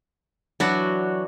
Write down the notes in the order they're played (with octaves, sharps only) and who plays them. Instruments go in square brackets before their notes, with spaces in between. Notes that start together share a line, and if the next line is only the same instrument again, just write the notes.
[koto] E3 D4 F#4 [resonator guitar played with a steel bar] F#3